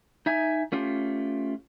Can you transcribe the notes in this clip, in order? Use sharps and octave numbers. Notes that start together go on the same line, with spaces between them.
D#4 E5 G#5
A3 C#4 F4 G4